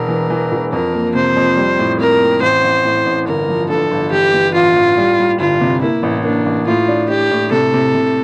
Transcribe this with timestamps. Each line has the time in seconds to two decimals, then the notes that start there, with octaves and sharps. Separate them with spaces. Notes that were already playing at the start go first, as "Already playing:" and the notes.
Already playing: E1 A#4
0.08 E3
0.30 E3
0.52 E1
0.73 F2 A#4
0.94 A#3
1.15 C3 C5
1.37 F2
1.57 G3
1.79 A2
2.00 C4 A#4
2.21 C4
2.42 A1 C5
2.64 A1
2.85 A2
3.06 A1
3.27 G1 A#4
3.49 F3
3.69 G2 A4
3.91 G1
4.12 E3 G4
4.34 E3
4.54 A1 F4
4.76 A1
4.98 G3
5.19 G3
5.40 G1 F4
5.61 C3
5.82 A#3 E4
6.03 A1
6.24 A#3 D4
6.46 A1
6.67 A2 F4
6.88 D4
7.10 D4 G4
7.31 A2
7.52 C3 A4
7.74 C3
7.95 C3